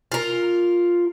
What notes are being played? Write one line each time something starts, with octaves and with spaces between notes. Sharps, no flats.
F4 A#4